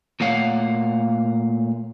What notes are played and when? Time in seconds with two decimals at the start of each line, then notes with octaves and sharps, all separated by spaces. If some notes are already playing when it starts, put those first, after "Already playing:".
0.20 A#2 A3 C#5 F5 F#5